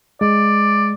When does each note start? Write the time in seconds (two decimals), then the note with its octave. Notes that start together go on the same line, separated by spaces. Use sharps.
0.21 G#3 D5